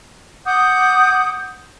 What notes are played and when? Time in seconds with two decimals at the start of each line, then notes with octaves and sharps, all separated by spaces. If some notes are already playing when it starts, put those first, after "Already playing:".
0.47 F#5 D6 D#6 G6